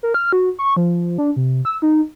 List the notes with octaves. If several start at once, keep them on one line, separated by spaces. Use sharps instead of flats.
A#4
F6
F#4
C#6
F3
D4
C3
E6
D#4